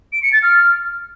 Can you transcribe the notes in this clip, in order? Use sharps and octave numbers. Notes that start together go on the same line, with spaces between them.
D7
C#7
A6
F6